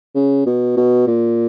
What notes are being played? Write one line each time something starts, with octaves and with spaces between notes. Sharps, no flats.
C#3
B2
B2
A#2